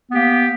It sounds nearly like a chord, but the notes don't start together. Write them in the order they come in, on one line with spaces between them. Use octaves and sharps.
B3 G4 A#3